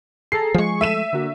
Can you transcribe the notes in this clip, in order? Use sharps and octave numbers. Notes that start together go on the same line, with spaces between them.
G#4 A4 A#5 C7
F3 G#3 G#4 C#6
A3 E5 D#7 E7
D3 A#3 F#4